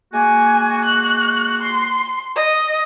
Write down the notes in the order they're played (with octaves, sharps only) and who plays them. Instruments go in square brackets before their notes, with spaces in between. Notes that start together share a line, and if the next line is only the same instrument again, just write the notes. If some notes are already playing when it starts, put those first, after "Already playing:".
[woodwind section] G#3 A#3 F#4 [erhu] G#5
[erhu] F#6
C6
D#5